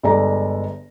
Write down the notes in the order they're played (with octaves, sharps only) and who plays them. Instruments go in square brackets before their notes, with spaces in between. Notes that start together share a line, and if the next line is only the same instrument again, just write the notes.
[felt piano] G1 G#3 A4 D5 A#5